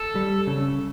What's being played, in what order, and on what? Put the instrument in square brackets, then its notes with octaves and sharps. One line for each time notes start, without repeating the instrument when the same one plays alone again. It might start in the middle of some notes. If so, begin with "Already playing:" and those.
Already playing: [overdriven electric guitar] A4
[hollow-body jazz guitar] G3
C#3